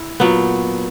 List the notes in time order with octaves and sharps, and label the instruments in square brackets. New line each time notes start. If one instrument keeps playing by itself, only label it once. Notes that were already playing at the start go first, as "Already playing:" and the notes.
Already playing: [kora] E4
A#2 F#3 B3